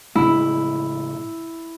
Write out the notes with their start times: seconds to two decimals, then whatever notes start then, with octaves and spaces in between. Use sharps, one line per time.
0.15 A2 C#3 G#3 E4